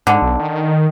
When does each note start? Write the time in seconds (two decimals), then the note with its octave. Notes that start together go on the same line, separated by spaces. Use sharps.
0.07 G#2 D3
0.22 B1
0.39 D#3